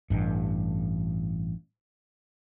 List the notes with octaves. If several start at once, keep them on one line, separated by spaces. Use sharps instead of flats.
A1 G2